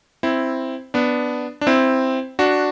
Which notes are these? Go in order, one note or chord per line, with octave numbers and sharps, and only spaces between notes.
C4 E4
B3 D4
D4
C4 E4
D4 F#4